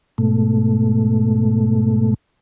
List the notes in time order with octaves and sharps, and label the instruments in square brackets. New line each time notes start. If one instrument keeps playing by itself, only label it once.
[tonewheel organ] G#2 B2 A3